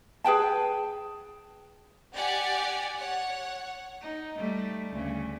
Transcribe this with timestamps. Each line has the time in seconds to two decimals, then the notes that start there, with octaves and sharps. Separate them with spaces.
0.24 G#4 B4 G5 A5
2.14 G4 D5 F#5 G#5
2.99 C#5 F#5
4.01 D#4
4.36 G3 A3
4.90 D2 C#3